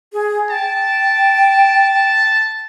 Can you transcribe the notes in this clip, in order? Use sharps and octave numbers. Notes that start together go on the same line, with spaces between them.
G#4
G5 A5